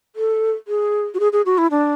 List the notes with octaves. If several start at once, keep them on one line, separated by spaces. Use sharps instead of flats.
A4
G#4
F#4
G#4
G#4
F#4
E4
D4